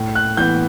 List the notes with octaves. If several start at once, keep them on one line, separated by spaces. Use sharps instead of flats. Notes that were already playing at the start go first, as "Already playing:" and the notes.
Already playing: A2
F#6
E3 B3 G6